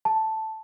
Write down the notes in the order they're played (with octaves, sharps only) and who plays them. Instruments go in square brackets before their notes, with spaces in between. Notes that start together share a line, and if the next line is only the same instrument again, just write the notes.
[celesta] A5